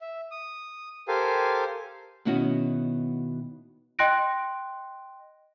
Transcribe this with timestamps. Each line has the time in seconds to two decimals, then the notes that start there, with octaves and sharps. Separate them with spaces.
0.01 E5
0.31 D#6
1.08 G4 A4 A#4 C5 F5 G#5
2.25 B2 D#3 B3 C#4 E4 F#4
3.99 D#5 G5 C6 F#6 A#6 D7